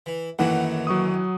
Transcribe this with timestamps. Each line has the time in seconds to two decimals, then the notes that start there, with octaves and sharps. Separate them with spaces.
0.06 E3
0.39 F#2 A2 D#3 E3 A#3 B4 F#5
0.87 F#3 C#6 D#6